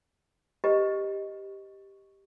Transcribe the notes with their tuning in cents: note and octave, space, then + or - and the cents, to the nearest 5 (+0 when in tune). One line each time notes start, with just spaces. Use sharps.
G4 +0 B4 +0 D#5 +0